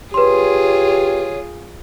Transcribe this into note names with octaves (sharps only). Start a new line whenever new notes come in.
F4 G4 G#4 B4 C#5 C6